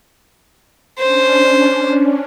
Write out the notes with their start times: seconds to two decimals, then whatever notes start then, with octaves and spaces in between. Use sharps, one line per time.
0.99 C#4 D4 C5